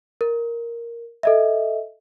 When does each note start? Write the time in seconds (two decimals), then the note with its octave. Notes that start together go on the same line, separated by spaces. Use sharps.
0.21 A#4
1.23 A4 D#5 E5